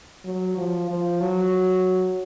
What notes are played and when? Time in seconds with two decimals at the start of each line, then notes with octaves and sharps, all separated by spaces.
0.25 F#3
0.57 F3
0.90 F3
1.21 F#3